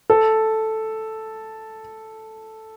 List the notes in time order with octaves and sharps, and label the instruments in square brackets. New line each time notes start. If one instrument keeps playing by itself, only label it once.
[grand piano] A4